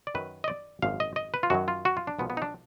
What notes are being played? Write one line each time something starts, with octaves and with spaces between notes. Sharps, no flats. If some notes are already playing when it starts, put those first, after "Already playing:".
D5
F#2 D#3 F#3 B4
D#5
D5
G#1 F#2 F3 F5
D#5
D#5
B4
F4
F#2 D#3 F#3 F#4
F4
F#4
F4
D4
B1 A#2 F3 G#3 B3
B3
D#4
D4